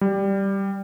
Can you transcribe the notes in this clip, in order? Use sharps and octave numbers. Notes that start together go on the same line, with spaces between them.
G3